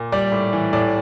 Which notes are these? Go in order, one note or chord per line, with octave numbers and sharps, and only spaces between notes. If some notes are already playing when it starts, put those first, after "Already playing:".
Already playing: A#2
G3 D5
A2
E3
A2 D5